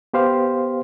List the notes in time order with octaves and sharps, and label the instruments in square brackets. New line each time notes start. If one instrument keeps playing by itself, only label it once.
[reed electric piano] B3 G4 C5 F5